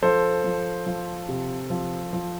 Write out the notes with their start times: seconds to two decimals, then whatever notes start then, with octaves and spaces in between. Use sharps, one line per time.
0.02 F3 A4 C5
0.44 F3
0.86 F3
1.29 C3
1.70 F3
2.13 F3